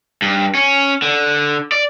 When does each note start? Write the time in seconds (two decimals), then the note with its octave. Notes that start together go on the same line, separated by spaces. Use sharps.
0.22 G2
0.55 C#4
1.02 D3
1.72 D5